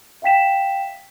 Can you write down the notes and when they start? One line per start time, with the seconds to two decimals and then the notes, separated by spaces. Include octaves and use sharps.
0.22 E5 F5 G5 B6 E7